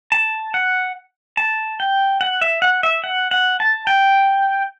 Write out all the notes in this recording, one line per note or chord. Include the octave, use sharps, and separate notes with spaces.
A5
F#5
A5
G5
F#5
E5
F#5
E5
F#5
F#5
A5
G5